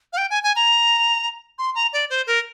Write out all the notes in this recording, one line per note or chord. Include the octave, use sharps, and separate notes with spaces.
F5
G5
G#5
G#5
A#5
C6
A#5
D5
C5
A#4